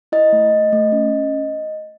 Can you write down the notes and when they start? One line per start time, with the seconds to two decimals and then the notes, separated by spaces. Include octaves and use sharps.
0.12 E4 D#5
0.33 A3
0.53 A3
0.73 A3
0.92 C#4